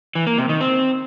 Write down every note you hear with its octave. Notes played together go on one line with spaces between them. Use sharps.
E3
A#3
C3
D#3
C4